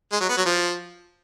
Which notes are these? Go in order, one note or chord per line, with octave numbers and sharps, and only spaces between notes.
G#3
F#3
B3
F#3
F3